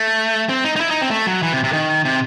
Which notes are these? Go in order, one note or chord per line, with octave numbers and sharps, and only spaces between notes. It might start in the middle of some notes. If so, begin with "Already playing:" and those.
Already playing: A3
C4
D#4
D#4
E4
D#4
C4
A3
F#3
E3
C3
C3
D#3
C3